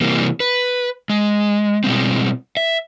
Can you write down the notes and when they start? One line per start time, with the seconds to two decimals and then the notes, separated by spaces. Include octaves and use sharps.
0.01 C3 E3 G3 A#3
0.40 B4
1.10 G#3
1.84 B2 G3 G#3 C4
2.57 E5